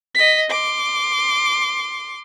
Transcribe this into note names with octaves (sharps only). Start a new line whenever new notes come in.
D#5 B6
C6 D6